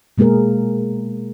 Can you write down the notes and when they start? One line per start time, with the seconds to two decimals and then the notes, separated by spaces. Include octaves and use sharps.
0.18 B2 G#3 A#3 G#4 A#4